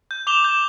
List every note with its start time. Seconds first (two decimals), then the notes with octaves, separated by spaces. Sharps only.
0.11 G6
0.27 D6 F7 G7
0.44 G6